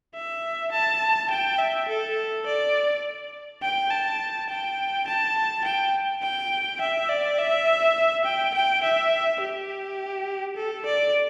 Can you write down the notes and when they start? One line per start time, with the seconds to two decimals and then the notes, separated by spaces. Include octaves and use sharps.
0.15 E5
0.72 A5
1.30 G5
1.59 E5
1.89 A4
2.46 D5
3.62 G5
3.91 A5
4.49 G5
5.07 A5
5.65 G5
6.23 G5
6.81 E5
7.09 D5
7.39 E5
8.25 G5
8.54 G5
8.83 E5
9.41 G4
10.57 A4
10.86 D5